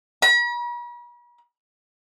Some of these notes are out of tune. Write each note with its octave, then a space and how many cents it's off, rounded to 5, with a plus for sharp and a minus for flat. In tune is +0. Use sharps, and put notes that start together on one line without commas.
B5 -45